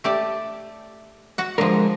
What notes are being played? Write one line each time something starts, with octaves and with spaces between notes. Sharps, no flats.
A3 G4 D5
F#4 F#5
D3 F3 G#3 A#4